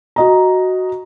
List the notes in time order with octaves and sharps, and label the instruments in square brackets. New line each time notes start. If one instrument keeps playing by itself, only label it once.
[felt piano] F#4 D#5 A#5